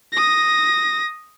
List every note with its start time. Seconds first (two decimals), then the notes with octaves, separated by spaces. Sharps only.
0.13 D#6 A#6